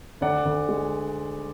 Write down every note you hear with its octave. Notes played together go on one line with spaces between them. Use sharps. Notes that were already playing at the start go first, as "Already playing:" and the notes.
D2 D5 F#5
D2
G#3